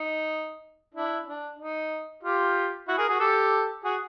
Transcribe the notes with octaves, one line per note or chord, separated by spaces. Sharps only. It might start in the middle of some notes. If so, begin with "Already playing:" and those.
Already playing: D#4
D4 E4
D4
D#4
F4 G4
E4 F#4
G#4 A#4
F#4 G#4
G4 A4
F#4 G#4